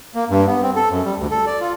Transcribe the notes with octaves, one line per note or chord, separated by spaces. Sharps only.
A#3
G2
B3
C4
A4
F#2
G3
D2
A4
D5
F4